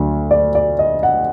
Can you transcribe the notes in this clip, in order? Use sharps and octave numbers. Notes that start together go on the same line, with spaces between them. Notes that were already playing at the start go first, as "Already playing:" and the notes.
Already playing: D2 D3 F#3 D4
D5
D5
D#5
F#5